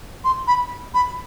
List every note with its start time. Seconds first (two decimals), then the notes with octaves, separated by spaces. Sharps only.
0.24 C6
0.47 B5
0.94 B5